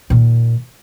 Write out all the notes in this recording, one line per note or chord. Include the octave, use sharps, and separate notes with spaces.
A#2 D#3